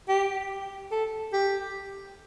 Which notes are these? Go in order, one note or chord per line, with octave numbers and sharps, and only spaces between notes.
G4
A4
G4